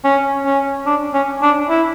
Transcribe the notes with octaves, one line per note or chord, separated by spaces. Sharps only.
C#4
C#4
D4
C#4
D4
E4